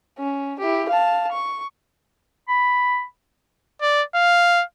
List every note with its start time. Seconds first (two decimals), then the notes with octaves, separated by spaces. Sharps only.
0.18 C#4
0.59 E4 G4
0.89 F5 A5
1.32 C#6
2.48 B5
3.82 D5
4.15 F5